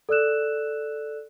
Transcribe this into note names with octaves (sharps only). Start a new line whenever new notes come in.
A4 D5 E6 F#6 E7